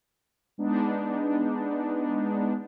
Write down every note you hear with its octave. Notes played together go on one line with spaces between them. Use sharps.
G#3 B3 D4 D#4